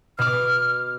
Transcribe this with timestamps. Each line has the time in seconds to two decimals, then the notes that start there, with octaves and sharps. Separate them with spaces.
0.19 B2 D6 F6